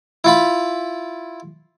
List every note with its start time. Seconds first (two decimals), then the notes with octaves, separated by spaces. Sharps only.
0.24 E4 F4 B5